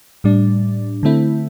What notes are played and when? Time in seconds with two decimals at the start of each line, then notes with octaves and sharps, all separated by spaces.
0.24 A2 G3 D4
1.03 D3 A3 C4 E4